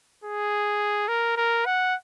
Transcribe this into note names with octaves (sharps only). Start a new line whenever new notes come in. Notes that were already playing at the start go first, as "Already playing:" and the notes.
G#4
A#4
A#4
F#5